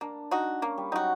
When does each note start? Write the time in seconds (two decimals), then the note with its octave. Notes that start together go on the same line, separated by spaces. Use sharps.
0.01 A#3 D4
0.31 D#4 F#4
0.62 A#3 C#4
0.78 G3
0.92 F#3 D#4 F#4